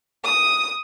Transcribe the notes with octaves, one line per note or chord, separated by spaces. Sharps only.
D#6